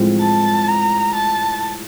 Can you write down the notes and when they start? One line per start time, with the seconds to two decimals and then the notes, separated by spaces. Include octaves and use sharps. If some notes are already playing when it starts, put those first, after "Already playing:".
Already playing: A2 F3 G#3 C4
0.21 A5
0.68 A#5
1.15 A5